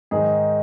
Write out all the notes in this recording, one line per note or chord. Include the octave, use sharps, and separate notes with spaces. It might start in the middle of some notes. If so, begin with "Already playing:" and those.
G#2 D#3 D#4 G#4